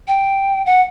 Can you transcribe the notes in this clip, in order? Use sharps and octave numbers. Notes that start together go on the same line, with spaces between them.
G5
F#5